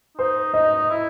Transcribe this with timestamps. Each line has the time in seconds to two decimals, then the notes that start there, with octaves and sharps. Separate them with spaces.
0.17 D#4 C5
0.54 D#4 D#5
0.90 E4